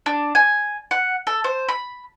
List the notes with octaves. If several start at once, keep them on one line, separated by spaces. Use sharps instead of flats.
D4
G#5
F#5
A4
C5
B5